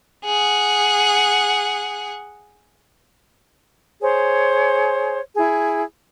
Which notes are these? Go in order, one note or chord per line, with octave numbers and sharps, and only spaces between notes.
G#4 F#5
G#4 C5 C#5
E4 G#4